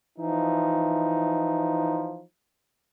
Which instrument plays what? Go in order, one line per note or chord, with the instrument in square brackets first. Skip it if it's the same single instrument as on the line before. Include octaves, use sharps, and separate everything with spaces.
[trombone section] E3 F3 D#4